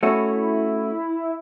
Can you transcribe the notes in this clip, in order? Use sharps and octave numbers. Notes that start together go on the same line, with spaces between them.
A3 C#4 E4 F#4